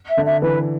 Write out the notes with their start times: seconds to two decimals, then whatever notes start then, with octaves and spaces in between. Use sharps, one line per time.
0.10 E5
0.17 D3
0.26 E5
0.42 E3 B4